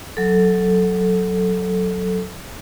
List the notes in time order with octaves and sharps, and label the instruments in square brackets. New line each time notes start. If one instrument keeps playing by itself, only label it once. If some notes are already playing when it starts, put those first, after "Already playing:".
[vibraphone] F#3 A4